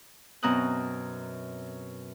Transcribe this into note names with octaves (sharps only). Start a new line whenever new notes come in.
F#2 B2 C4 A#5 D#6 F#6